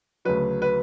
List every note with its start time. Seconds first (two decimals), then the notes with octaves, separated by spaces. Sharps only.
0.25 D2 C#3 F#3 B4
0.62 B4